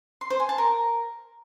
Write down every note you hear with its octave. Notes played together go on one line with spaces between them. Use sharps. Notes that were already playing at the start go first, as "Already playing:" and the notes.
C6
C5
G#5
A5
A#4